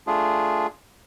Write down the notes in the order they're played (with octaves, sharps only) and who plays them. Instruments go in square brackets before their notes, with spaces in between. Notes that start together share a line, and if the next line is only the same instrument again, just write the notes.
[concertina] A3 D4 F4 G#4